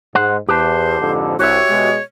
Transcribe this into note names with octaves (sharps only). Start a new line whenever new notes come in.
G#2 C5 F#5
E2 G4 B4 C5 A5
F2 G#2 D3
C2 F#4 G4 C#5 E5
B2 G#3